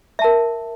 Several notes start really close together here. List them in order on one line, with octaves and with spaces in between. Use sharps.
E5 A5 A#4